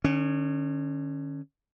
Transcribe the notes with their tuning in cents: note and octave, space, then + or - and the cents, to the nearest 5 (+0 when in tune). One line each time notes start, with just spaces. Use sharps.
D3 +45 C#4 +0